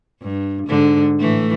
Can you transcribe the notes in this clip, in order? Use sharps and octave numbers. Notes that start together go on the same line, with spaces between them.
G2
G#2 D3
A2 E3 A3